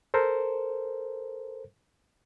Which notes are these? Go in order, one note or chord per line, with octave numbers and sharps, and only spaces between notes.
A4 A#4 C5